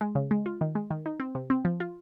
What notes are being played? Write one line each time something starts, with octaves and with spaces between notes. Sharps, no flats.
G#3
C#3
G#3
F4
D#3
G#3
D#3
D#4
C4
C3
C4
F3
F4